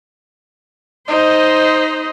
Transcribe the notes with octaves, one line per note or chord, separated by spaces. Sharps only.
D#4 C5 D#5